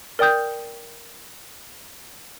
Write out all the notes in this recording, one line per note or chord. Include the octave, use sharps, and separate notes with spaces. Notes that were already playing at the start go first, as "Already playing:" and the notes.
A#4 D5 G5 D#6 G6